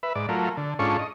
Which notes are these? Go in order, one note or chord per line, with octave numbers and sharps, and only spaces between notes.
B4 E5
G#2 D5
F#3 A3 F4 A#4
D3
G#2 C#4 D4 F4 A4 C#6
D#5